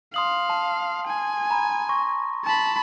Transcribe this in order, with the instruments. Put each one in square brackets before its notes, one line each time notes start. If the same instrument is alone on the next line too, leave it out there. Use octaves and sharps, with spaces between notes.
[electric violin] F5 [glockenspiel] C6 D#6 F#7
[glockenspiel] A5
[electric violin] G#5
[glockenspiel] A#5 B5
C6 C#6 A#6
[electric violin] A5 B5